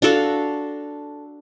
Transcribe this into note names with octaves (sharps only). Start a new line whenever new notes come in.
D4 F#4 A4 F5